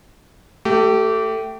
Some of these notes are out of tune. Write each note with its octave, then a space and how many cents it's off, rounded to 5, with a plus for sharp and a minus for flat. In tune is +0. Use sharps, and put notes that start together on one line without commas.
A3 +15 G4 -20